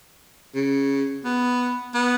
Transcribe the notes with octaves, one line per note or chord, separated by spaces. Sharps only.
C#3
B3
B3